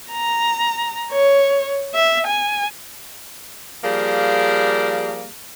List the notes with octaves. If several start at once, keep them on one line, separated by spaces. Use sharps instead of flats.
A#5
C#5
E5
G#5
F3 G3 A#3 G#4